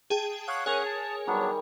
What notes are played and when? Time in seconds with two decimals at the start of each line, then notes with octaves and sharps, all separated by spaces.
0.10 G#4 G5 A5
0.48 C#5 F5 F#5 D#6 F#6
0.66 C#4 G#4 A#4 C#5 F#5
0.86 A5
1.27 D#3 F#3 G3 B3 D4